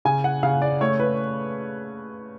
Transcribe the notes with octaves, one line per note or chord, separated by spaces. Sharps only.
C#3 G#5
F#5
C#3 F5
D5
A3 C#5
B4